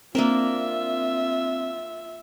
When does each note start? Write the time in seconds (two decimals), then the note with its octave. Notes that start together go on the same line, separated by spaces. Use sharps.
0.15 A#3 C4 D4 F4 A#4 E5